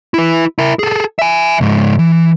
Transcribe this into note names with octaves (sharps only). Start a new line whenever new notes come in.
E4 B4
E4 A#4
G#4 A4
E5 G#5
C#2 G#2
E3